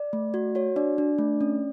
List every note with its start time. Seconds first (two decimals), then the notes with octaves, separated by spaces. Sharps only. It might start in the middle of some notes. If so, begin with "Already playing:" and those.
Already playing: D5
0.13 A3
0.34 F#4
0.55 F#4 C#5
0.76 D4 D5
0.98 D4
1.18 A3
1.41 C#4